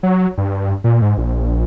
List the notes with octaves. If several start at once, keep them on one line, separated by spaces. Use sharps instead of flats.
F#3
G2
A#2
G#2
A#1